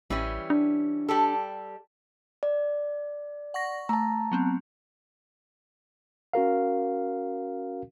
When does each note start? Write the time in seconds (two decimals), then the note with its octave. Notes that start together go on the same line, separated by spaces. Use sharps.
0.10 A1 E3 G3 C#4
0.50 D4
1.09 G3 G4 A4
2.43 D5
3.54 F#5 C#6 A#6
3.89 A3 A5 A#5
4.32 F#3 B3 C4
6.33 C#4 F#4 A#4 F5